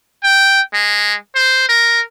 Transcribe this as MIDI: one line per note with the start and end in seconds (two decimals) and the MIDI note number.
0.24 0.61 79
0.74 1.15 56
1.35 1.67 72
1.69 2.01 70